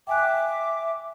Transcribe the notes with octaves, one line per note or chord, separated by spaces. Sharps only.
E5 G5 G#5 D6 F#6